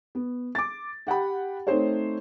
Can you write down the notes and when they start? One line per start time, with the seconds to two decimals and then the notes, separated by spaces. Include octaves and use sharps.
0.15 B3
0.55 D6 A6
1.07 G4 F#5 G5 B5
1.67 A3 C4 D#4 C5 C#5